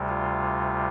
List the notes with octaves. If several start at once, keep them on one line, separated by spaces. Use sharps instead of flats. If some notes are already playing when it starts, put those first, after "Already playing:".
Already playing: D2 C3 G3
F4